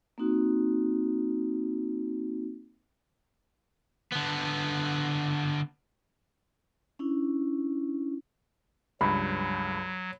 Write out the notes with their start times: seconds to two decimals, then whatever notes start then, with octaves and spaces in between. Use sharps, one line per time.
0.18 A#3 C4 D#4 F#4
4.12 D3 B3
6.99 C#4 D4 E4
9.01 C#2 G2 F#3 B5